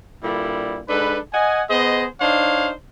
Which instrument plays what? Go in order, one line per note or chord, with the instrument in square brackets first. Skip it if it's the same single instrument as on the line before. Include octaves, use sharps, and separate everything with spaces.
[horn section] G2 A#2 D3 G3 E4
G#2 D4 A4 B4
D#5 F#5 G#5
B3 G#4 C5 D#5
D4 D#4 C5 C#5 F5